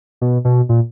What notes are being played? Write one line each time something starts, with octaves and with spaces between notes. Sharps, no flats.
B2
B2
A#2